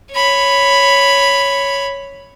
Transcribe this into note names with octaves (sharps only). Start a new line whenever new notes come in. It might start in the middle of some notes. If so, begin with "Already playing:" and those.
C#5 B5